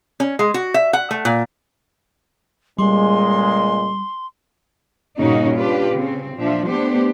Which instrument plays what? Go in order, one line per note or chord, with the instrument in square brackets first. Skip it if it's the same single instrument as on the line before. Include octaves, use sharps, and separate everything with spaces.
[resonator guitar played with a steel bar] C#4
G#3
F#4
E5
F#5
A3
A#2
[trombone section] C#2 A#2 G#3 [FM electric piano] G3 [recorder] C6
[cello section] G2 A#2 C#3 A#3 D#4 F#4
D4 F4 G4 B4
C#3 C4
A#2 F3 D4 E5
A3 B3 D4 G4 C5